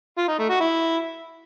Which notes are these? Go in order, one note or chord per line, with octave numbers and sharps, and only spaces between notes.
F4
D#4
A3
F#4
E4